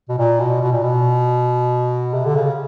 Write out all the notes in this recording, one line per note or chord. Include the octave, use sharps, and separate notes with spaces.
B2
A#2
B2
B2
A#2
B2
C3
D3
C#3